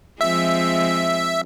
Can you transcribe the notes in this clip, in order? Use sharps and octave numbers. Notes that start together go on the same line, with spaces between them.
F3 G#3 C4 E5